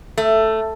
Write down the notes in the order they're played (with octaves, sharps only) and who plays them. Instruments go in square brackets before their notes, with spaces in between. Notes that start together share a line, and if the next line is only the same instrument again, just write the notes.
[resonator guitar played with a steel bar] A3